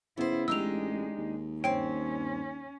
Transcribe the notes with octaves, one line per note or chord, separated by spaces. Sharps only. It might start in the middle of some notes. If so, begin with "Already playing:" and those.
C#3 B3 E4 C5 C#5
A1 G#3 D4 D#4 G4 E6 F7
D#2
G2 C4 C#4 C#5 G5